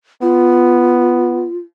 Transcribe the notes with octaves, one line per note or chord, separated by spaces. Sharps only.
B3 F4